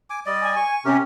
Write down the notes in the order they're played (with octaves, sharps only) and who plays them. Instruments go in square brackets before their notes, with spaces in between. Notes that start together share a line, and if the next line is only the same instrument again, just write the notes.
[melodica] G#5 D6
G3 D5 D#5
[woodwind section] G#5
[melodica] C#6
[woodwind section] C3 C4 C#4 [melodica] G4 A#4